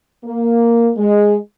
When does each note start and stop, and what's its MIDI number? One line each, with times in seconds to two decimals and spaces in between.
0.25 0.90 58
0.97 1.35 56